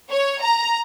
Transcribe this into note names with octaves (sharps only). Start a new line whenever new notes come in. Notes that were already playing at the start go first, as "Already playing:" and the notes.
C#5
A#5